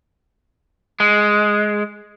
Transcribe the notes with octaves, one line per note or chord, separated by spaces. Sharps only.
G#3